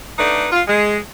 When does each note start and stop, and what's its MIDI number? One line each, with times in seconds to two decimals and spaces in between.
0.18 0.47 50
0.18 0.47 57
0.18 0.47 63
0.18 0.47 71
0.18 0.47 74
0.52 0.62 65
0.68 0.97 56